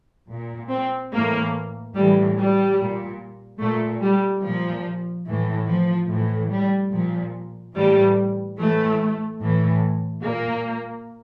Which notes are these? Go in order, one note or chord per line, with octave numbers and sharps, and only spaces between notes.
A#2
C4
A2 E3 A#3
A2 E3 G3
G3
A#2
A#2 A3
G3
A#2 F3
A2 E3
F3
A2 E3
G3
A#2 F3
A2 E3 G3
A2 E3 A3
A2 E3
A#2 A#3